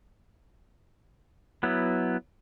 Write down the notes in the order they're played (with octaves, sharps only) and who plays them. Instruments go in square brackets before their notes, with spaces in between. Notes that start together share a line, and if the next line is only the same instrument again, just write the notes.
[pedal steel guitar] F#3 B3 E4